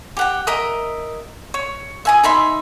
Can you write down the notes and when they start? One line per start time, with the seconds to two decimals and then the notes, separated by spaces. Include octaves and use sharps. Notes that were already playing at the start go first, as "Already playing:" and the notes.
0.17 G4 F#5 G5
0.47 A#4 D#5 E5 D#6
1.54 C#5
2.05 E5 G#5 D#6
2.24 D#4 E5 B5 C6